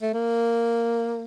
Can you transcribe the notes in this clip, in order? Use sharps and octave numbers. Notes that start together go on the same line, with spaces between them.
A3
A#3